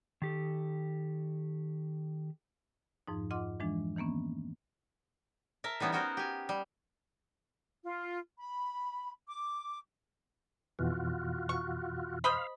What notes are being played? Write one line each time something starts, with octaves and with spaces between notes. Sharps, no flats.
D#3 G4 A4
F2 G#2 F3 D#4
F4 D#5 F#5 C6 D6
E3 F3 G#3 D4
D#3 E3 A#3 B3 C#4
A#4 E5 A5
E3 G3 B3 C#4 D#4
B3 C#4 F#4 A#4 C5
G4 G#5
G3
F4
B5
D6
F2 B2 E3 F4 F#4
C#6
C5 D#5 F5 B5